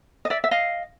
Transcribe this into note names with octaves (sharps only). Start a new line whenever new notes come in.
D#5
D5 E5
E5
D#5 F5